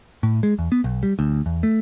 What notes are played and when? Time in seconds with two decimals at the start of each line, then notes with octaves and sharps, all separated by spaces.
0.23 A2
0.43 G#3
0.59 E2
0.72 B3
0.84 B1
1.03 G3
1.19 D2
1.46 E2
1.63 A3